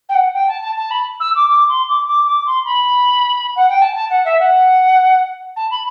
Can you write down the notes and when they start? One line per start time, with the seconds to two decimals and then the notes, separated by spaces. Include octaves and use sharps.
0.09 G5
0.14 F#5
0.33 G5
0.47 A5
0.61 A5
0.77 A5
0.90 B5
1.20 E6
1.35 D6
1.49 D6
1.68 C6
1.88 D6
2.06 D6
2.26 D6
2.46 C6
2.64 B5
3.56 F#5
3.69 G5
3.81 A5
3.95 A5
4.10 F#5
4.25 E5
4.39 F#5
5.56 A5
5.70 B5